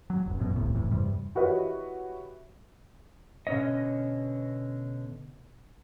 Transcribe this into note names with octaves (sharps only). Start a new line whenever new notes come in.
F#3
E1 A1
A#1 F#2 B2
D#1 C2 A2 C3
F1 A#1 A2 E3
E2 G2 C3 G3
E4 F#4 G4 B4 C#5 D#5
B2 D3 C#4 C#5 D#5